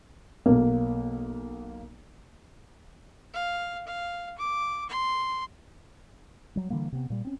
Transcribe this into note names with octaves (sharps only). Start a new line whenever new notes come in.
B1 A#3
F5
F5
D6
C6
F#3 G3
D3 E3 G3 A#3
C3 B3
A#2 G3
C4 C#4